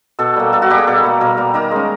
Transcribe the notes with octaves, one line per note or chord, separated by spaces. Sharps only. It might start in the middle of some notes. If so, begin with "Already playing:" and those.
B2 A4
G3 A#3
B2 A4
F#4
G3 A#3 G4
G#4
B2 A4
G3 A#3
B2 A#4
G3 A#3
D#3 A#4
G#3 C#4